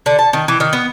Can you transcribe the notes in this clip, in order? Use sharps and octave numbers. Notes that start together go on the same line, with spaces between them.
D3
A5
D#3
E3
D#3
B3